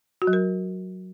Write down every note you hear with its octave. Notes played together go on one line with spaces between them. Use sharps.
F#4
F#3
A#4